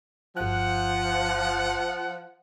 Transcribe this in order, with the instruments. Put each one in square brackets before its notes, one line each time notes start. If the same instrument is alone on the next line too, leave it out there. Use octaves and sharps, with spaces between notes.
[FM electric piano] G1 F#6 [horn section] F3 F#5